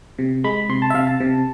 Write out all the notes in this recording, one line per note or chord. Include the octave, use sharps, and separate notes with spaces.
C3
G#3 B5
C3 C6
A5
E5
C3 F5
A5
C3